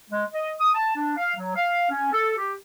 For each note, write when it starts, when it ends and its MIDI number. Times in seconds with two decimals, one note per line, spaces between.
0.11 0.25 56
0.33 0.50 75
0.60 0.73 87
0.74 0.93 81
0.96 1.13 62
1.17 1.33 77
1.37 1.51 54
1.56 1.87 77
1.91 2.10 61
2.13 2.35 69
2.37 2.54 67